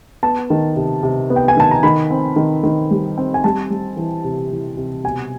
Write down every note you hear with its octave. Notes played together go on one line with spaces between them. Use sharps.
B3 A5
D#3
C3
C3
B3
G5
G#5
D#3 A5
A#5
D#3 B5
C4
D#3
D#3
G3
C4
G#5
G3 A5
G3
E3
C3
E3
C3
B2 G#5